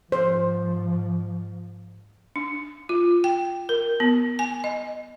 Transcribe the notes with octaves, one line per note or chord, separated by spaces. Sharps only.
G#2 F3 C5
D4
F4
G5
A#4
B3
G#5
D#5